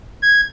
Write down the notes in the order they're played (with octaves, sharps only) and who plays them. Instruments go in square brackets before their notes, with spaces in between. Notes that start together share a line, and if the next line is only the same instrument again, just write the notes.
[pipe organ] G#6